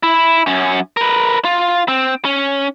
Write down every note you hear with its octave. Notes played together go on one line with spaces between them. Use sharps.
E4
F#2 C#4
A#4 B4
F4
C4
C#4